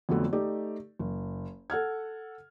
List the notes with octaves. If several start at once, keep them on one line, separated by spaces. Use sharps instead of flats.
F2 D3 F#3 A3 B3
A3 D#4 G4 D5
F#1
A4 F#5 F6 G#6